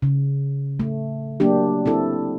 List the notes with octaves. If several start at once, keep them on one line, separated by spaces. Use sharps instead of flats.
C#3
A3
F#3 A#3 D4 G4
C4 E4 A4